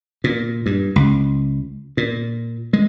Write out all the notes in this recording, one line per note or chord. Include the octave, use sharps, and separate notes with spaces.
A#2
G2
C#2
A#2
G#3